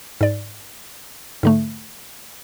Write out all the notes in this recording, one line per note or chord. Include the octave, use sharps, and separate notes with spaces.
G#2 D5
G#2 D3 A3